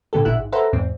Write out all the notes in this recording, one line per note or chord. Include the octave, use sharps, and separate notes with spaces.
A2 D3 B3 G4 A4
G1 A#2 E4 E5 F#5 F#6
G#1
A4 B4 C5 E5 F#5 A#5
E2 G#2 C4